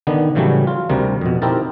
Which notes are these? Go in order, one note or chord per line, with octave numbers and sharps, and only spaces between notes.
D3 D#3 B3 D4
A2 C#3 E3 F#3 G3 A3
F4
D2 C3 G3 A#4
F2 B2
C4 D#4 E4 G4 A#4 A5